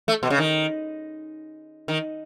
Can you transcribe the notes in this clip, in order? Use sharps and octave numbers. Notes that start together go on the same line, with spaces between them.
A3
B2
C#3
D#3
D#3